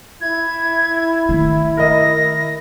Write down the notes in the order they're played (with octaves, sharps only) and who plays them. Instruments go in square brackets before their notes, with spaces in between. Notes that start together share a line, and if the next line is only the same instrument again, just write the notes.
[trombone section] E4 [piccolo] G#6
[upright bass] D#3 A3
[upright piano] A#4 D#5 [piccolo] A#6